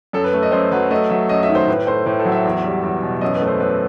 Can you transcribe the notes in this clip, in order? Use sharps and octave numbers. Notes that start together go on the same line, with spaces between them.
F#2 A4
B4
A3
D#5
F#2 C5
F#3 B4
A3 D#5
F#3 E5
F#2 D#5
E5
D#3
C5
A2 B4
A3 C5
A2 B4
A4
F#3
E5
E2
G3
E2
B2
F#2 D#5
B4
A3
C5
F#2 B4